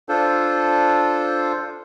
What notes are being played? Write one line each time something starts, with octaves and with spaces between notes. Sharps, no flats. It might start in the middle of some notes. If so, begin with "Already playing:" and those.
D4 F4 A4 C5